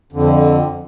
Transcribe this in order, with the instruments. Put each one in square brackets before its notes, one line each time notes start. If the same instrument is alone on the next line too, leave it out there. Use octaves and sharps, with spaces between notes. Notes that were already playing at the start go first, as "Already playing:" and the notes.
[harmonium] F2 D3